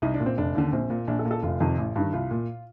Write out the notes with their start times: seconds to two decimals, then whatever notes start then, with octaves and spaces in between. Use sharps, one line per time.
0.02 C2 D#4
0.14 D4
0.20 A#2
0.26 C4
0.38 F1 D4
0.55 D#2 D3
0.73 A#1 C4
0.90 A#2
1.07 A#1 D4
1.19 A4
1.25 A#2
1.31 A4
1.42 F1 F4
1.60 F2 C3 D#3
1.78 A1
1.96 G2 D#3
2.13 C2 F4
2.31 A#2